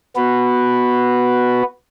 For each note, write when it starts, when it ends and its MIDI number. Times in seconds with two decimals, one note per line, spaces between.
0.16 1.63 59
0.16 1.63 66
0.16 1.63 71